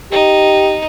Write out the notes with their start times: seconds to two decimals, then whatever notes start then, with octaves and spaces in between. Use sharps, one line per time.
0.12 D#4 G4